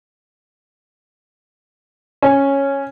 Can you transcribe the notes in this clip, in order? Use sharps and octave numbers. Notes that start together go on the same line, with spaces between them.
C#4